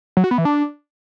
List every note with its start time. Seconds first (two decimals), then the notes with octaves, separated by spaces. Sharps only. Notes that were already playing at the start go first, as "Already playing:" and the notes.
0.17 F#3
0.24 F#4
0.31 B3
0.38 E3
0.45 D4